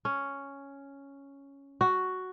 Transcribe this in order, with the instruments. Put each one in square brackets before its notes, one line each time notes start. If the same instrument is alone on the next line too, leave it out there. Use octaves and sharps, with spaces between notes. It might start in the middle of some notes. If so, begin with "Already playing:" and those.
[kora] C#4
F#4